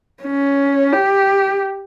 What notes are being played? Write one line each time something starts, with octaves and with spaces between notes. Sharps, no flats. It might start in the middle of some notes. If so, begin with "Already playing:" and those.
C#4
G4